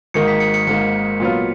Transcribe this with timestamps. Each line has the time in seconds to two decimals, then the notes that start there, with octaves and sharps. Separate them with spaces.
0.14 G#1 G#2 D#3 A#3 C#7
0.28 B6
0.40 C#7
0.54 C#7
0.67 G#1 G#2 D#3 A#3 C#7
1.20 A#2 F#3 B3 F4